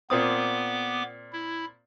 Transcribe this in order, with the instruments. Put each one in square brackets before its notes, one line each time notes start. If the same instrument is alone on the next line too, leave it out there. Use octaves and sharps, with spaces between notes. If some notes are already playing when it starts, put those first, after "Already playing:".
[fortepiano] A#2 C4 D#6 [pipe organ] B3 D6
[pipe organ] E4